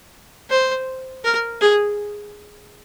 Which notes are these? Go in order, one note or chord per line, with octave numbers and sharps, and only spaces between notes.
C5
A#4
G#4